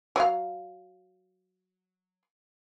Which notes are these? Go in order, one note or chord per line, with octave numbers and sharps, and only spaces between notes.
F#3 F5